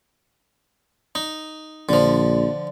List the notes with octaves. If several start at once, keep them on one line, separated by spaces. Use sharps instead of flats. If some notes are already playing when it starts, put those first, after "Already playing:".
D#4
A#1 D3 F3